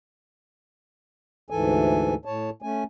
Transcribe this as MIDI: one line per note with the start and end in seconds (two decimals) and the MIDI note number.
1.50 2.15 38
1.50 2.15 44
1.50 2.15 52
1.50 2.15 69
1.50 2.15 80
2.25 2.50 45
2.25 2.50 73
2.25 2.50 81
2.62 2.84 57
2.62 2.84 61
2.62 2.84 80